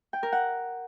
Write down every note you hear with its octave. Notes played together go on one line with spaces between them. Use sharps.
G5
A#4
F#5